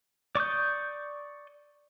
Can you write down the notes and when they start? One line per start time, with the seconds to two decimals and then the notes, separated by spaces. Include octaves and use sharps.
0.35 D5 C#6 D#6 G6